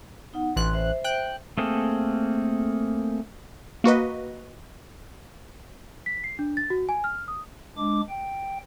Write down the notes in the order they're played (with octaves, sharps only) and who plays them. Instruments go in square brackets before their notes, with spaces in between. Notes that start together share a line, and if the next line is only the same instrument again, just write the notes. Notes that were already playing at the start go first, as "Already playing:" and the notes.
[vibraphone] B3 D#4 F#5
[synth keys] A1 F#6 [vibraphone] C6
[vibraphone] C5 E5
[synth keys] G5 F#6
[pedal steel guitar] A3 A#3 C4 G#4 A4
[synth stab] A#3 F#4 B4 D#5
[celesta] B6
C7
D4
A6
F#4
G#5
F6
D#6
[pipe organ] G#3 D4 D6
G5